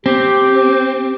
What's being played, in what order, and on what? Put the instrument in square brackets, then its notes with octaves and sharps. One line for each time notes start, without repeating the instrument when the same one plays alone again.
[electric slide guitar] C4 [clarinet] G4